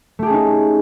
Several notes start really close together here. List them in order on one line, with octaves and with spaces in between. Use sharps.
A3 G4 G#4 C#4 D#4